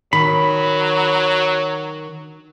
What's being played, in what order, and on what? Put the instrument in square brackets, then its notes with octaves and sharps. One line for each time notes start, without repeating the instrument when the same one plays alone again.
[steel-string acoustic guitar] D#3 [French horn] F#3 [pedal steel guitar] B5